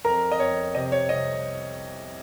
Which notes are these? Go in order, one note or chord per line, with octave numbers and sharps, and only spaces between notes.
F2 A#4 A#5
D#5
F2 C#5
C3 D#5
C#5
C2 D#5